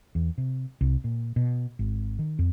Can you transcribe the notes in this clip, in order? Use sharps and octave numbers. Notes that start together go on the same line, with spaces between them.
E2
C3
C2
A#2
B2
G#1
D#3
F2